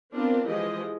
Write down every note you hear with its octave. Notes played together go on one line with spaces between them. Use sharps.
B3 C4 D4 F4 A#4
E3 F3 G#3 G4 D#5